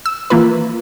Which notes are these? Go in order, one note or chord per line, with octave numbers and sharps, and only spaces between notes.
E6
E3 A#3 F4 B4